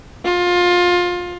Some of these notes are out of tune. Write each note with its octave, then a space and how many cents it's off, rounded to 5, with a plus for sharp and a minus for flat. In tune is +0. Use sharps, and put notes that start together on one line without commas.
F4 +20